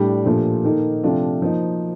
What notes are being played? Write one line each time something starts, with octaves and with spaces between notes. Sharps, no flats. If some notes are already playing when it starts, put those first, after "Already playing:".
Already playing: A2 G3 D4 G4
A#2 F3 A3 D4 G4
D#3 A#3 D#4 A4
C3 F3 A3 D4 F4
F3 A#3 D#4